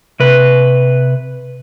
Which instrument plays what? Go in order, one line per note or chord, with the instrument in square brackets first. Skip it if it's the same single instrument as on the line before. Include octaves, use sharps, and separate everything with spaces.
[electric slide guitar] C3 B4